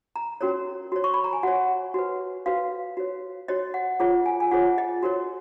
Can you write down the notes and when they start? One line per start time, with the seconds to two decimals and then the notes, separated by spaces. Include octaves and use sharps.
0.16 A#5
0.41 C#4 F#4 A#4 C#5
0.92 F#4 C#5
1.04 C#6
1.14 B5
1.24 A#5
1.33 G#5
1.43 F#4 C#5 F#5
1.94 F#4 B4
2.46 F#4 B4 F5
2.97 F#4 C#5
3.48 F#4 C#5 D#5
3.74 F#5
4.00 F4 G#4 C#5 F#5
4.26 G#5
4.40 G#5
4.51 F4 G#4 C#5 F#5
4.78 D#5
5.03 F#4 A#4 C#5